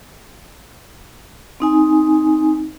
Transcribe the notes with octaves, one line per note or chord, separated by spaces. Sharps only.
C4 D#4 G#5